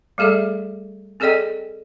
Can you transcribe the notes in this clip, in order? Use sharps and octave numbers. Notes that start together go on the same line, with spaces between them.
G3 A3 G#4 A4 E5
C4 G#4 A4 D5 D#5 G5